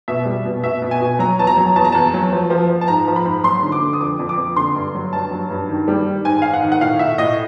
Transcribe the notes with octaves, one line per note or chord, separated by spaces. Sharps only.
B2 E5
G3
B2
B2 E5
B2
G#5
B2
F#3 A#5
E2 A5
A#5
F#3
E2 A5
A#5
E2 A5
F#3
F3
F3
F3
A5
G#2 A#5
F3
B5
G#2
F#3 C6
D3
D6
D3
D#6
F2 D6
F2
D6
F2
D3 C6
G2
F#3
G2 A5
F#3
G2
D#3
G3
D#3
G#2 G#5
G#2 F5
F#5
D#3
F#5
A2 F5
A2 E5
A2 D#5